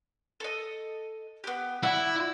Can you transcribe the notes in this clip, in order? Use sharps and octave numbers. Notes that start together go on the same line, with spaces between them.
A4 D#5
B3 G4
E4 F#4 D5